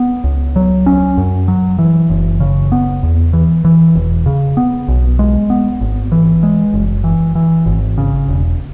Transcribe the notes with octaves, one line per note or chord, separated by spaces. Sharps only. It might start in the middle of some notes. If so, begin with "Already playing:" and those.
Already playing: B3
C#2
F#3
C#4
F#2
F#3
E3
F#1
C#3
B3
E2
E3
E3
E1
C#3
B3
B1
G#3
B3
G#1
E3
G#3
F#1
E3
E3
G#1
C#3
E1